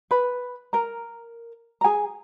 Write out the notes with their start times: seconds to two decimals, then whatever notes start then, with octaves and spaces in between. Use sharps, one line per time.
0.11 B4 B5
0.73 A#4 A#5
1.81 A#5
1.84 G#4 G#5